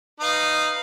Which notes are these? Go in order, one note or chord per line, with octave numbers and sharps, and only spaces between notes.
D#4 B4 F5